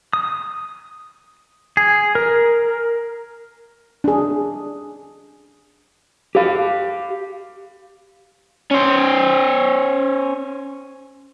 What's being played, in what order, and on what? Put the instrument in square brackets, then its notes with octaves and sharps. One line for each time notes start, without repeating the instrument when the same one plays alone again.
[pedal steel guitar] D#6
G#4
A#4
[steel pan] D4 G#4
[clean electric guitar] G4 F5
[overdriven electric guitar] C#4 C5